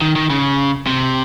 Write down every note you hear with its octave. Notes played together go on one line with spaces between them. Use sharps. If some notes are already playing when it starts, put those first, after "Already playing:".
D#3
D#3
C#3
C3